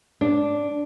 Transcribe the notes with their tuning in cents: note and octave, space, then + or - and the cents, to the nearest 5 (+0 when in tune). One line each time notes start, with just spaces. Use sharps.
D4 -5